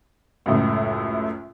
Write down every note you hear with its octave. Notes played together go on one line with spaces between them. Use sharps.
C#2 F#2 A2